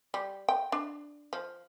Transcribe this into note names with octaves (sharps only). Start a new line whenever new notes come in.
G3
G5
D4
F3